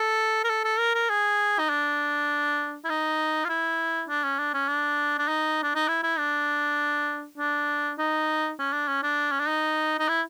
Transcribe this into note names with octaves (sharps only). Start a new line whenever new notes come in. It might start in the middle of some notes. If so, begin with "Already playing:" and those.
Already playing: A4
A#4
A4
A4
A#4
A#4
G#4
D#4
D4
E4
D#4
F4
E4
D4
C#4
D4
C#4
D4
D4
D#4
D4
D#4
E4
E4
D4
D4
D#4
C#4
D4
C#4
D4
C#4
D4
D#4
D#4
E4